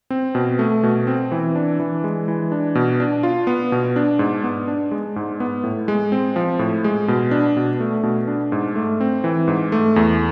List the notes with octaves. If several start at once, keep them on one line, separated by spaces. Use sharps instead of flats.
C4
B2
A3
B2
C4
E3
D4
E3
G#3
E3
D4
B2
D4
F4
B3
B2
D4
G#2
B3
D4
G#3
G#2
B3
A2
G#3
C4
F3
A2
G#3
B2
D4
B2
A3
B2
D4
G#2
A3
C4
E3
G#2
A3
E2